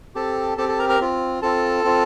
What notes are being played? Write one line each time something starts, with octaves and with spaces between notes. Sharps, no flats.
C4 G4 A4 A5
C4 G4 A4 A5
A4 A5
A#4 A#5
A#4 A#5
C4 F4
C4 F4 A4 A5
C4 F4